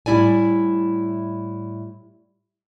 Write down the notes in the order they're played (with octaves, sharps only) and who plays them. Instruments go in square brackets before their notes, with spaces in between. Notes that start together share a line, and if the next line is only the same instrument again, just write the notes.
[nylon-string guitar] A2 G3 C4 E4 D5 G#5